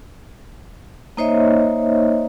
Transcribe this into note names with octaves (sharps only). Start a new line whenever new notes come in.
A#3 D#4 C5 C#5 D#5 E5